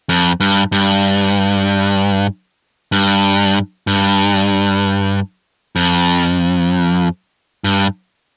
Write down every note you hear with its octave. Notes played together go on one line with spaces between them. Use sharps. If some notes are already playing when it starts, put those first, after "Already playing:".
F2
G2
G2
G2
G2
F2
G2